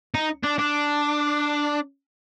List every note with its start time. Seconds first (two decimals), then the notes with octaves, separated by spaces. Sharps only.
0.15 D#4
0.43 D4
0.58 D4